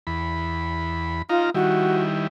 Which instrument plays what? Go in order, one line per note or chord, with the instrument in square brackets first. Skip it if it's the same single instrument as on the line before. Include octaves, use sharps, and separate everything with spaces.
[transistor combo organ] E2 B5
[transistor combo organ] D#4 F5 A#5 [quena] F4
[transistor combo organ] D#3 G3 E4 [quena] F#4